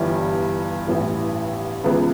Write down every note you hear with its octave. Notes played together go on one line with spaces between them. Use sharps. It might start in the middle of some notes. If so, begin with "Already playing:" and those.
Already playing: G1 G2 E3 G3
A1 G2 E3
C#2 C#3 E3 B3